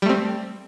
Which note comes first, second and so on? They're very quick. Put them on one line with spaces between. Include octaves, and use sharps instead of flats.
G3 A3 C4